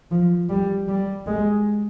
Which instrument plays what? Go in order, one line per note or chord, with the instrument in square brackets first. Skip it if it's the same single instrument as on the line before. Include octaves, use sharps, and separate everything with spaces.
[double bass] F3
G3
G3
G#3